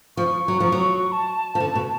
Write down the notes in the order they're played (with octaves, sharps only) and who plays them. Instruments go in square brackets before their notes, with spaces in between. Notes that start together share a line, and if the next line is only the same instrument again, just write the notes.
[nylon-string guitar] F3 [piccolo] C#6
[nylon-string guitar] F#3
F3
F#3
[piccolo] A5
[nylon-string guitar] F3
D3
B2